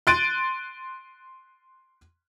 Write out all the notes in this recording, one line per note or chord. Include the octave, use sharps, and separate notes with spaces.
C6 F#6 A6 D7 D#7